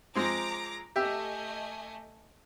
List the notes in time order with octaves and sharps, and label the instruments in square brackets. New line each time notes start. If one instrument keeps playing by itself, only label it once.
[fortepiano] F3 G#3 C4 [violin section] A#5 D6 A#6
[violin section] A3 D#5 G#5 [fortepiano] G4 E5 G5